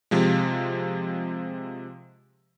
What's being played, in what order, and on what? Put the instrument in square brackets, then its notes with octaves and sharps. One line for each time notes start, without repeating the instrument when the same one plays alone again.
[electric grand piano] C3 F3 G#3